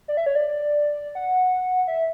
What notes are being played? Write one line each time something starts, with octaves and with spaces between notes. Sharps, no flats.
D5
E5
C#5
D5
F#5
E5